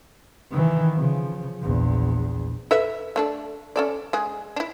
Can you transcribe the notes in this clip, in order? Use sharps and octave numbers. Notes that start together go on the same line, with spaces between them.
D#3 E3
C#3 F3
A#1 E2
A4 B4 E5
A3 D4 A4
C#4 A4 D5
G#3 G#4
D4 E4